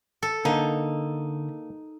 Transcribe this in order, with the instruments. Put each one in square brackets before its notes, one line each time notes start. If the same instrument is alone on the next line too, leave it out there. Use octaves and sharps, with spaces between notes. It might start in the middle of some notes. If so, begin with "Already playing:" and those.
[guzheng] A4
[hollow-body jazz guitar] D3 [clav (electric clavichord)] A#3 A4 [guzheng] D#4